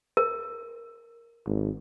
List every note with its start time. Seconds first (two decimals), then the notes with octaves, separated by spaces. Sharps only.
0.17 A#4
1.46 G#1